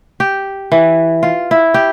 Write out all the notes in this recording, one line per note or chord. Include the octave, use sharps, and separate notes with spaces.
G4
E3
F4
E4
G4